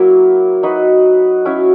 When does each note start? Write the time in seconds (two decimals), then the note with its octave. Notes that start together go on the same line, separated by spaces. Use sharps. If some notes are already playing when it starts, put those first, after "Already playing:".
Already playing: F#3 A#3 E4
0.63 D#4 F#4 B4
1.45 F#3 C#4 E4